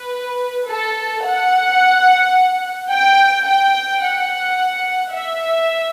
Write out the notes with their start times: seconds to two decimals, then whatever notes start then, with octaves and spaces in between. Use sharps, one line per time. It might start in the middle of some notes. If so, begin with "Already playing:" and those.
Already playing: B4
0.67 A4
1.24 F#5
2.91 G5
3.46 G5
4.02 F#5
5.13 E5